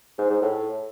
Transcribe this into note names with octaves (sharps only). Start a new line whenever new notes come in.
G#2
G#2
A2